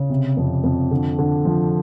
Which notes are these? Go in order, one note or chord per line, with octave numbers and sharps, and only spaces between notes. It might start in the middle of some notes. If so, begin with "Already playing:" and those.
Already playing: C#3
C3
F2
F2
D3
D3
F3